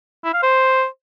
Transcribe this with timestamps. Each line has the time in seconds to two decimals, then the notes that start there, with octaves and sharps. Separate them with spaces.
0.24 E4
0.34 F5
0.43 C5